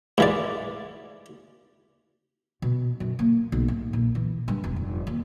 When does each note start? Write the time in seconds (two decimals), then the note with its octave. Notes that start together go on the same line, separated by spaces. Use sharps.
0.18 G#2 E3 D5
2.62 B2
3.00 F#2
3.19 A#3
3.52 B1
3.68 A2
3.93 A#2
4.15 E3
4.48 G2
4.64 E1
4.76 F1
5.07 D#2